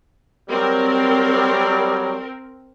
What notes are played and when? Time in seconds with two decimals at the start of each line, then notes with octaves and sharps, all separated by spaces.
0.49 F#3 G3 C4 A#4